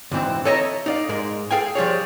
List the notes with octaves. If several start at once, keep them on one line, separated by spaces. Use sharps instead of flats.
D2 G#2 E3 C4
A4 C#5 D#5 E5 F#5 A#5
D#4 D5 F5
G#2 G#3 A#4
G#4 A4 F5 G5 G#5
F3 G3 G#4 C#5